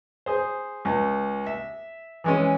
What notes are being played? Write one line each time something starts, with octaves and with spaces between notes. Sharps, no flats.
G#4 C5
C#2
E5
E3 G#3 C#4